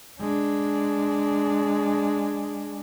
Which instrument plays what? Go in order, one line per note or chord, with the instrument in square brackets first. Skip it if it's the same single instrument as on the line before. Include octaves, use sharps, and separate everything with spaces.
[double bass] G#3 D4